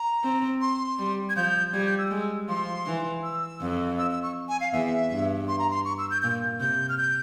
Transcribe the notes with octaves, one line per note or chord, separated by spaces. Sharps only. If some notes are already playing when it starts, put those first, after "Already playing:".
Already playing: A#5
C4
C6
G3
G#6
F3 G6
G3 G#6
G6
E6
G#3
F3 C6
E3
E6
F2
E6
E6
C#6
G#5
F5
E2 E5
G2
C6
A#5
C6
C#6
E6
G6
A#2 G6
C3 G6
F6
G6